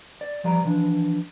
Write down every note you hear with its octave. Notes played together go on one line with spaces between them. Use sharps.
D5
E2 F3 G3 D5 A#5
E3 F3 D4